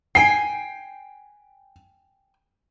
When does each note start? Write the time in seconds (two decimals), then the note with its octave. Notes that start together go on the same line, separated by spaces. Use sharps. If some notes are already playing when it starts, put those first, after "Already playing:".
0.15 G5 G#5 C7